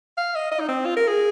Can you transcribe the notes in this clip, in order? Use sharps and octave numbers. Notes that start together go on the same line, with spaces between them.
F5
D#5
D#5
D#4
C4
F4
A#4
G#4